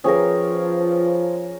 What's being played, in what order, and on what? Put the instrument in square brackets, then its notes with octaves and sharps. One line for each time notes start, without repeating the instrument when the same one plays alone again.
[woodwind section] F3 [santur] C#4 G#4 A#4 [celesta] B4 G5 D#6